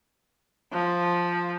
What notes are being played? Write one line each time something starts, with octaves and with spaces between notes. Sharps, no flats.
F3